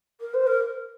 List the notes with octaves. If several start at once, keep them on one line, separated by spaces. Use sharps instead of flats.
A#4
C5
A#4